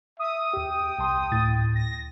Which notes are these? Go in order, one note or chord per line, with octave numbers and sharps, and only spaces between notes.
E5 D#6
D#2 G4 G5
C2 A5 C6
D2 A2 A6
A#6